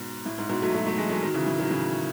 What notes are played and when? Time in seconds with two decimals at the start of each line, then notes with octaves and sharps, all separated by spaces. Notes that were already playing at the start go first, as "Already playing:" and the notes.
Already playing: G#2 B2
0.26 A2
0.38 G#2
0.49 G#2 B2
0.62 F#3 A3
0.74 F#3 A3
0.86 F#3 A3
0.98 E3 G#3
1.10 F#3 A3
1.22 D#3 F#3
1.34 C#3 E3
1.46 A2
1.59 D#3 F#3
1.70 A2 C#3